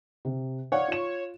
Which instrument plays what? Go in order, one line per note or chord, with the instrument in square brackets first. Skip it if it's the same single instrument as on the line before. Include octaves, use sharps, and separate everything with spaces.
[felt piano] C3
[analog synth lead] C#5 [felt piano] D5 F5 F#5
[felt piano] F4 E7